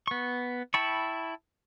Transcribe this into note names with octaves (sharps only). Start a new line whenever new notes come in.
B3 C#6
E4 G5 A5 B5 C#6